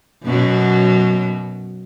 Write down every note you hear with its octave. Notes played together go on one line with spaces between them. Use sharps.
F#2 B2 F#3